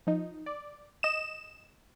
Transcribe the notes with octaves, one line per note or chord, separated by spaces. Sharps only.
F3 D#4
D5
D#5 E7